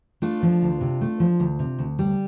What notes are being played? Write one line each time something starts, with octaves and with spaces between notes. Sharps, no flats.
A3 D4 F4
F3
D2
C3
A3
F3
D2
C3
D2
G3